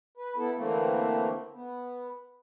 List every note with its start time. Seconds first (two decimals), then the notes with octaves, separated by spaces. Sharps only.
0.17 B4
0.36 B3 E4 A4
0.56 D3 E3 A3 A#3 C4
1.54 B3